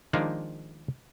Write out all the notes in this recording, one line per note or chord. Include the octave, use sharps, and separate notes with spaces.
D#3 F3 G#3 A#3 D4 D#4